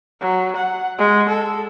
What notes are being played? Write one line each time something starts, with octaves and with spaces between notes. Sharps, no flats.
F#3
F#5
G#3
A4